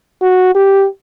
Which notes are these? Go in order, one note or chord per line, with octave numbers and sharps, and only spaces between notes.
F#4
G4